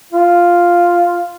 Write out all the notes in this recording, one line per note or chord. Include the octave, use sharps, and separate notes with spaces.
F4